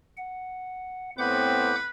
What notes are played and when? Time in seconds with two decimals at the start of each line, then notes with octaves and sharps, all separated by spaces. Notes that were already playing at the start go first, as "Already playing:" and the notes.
0.17 F#5
1.19 A2 B3 C4 B4 F#5 D6 G6